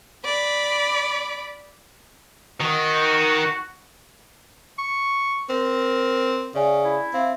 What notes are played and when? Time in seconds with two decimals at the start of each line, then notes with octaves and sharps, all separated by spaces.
0.25 D5 B5
2.61 D#3 F#4
4.79 C#6
5.50 C4 A#4
6.55 C#3 D5 E5 G#5
6.85 E4
7.14 C4 E5 F5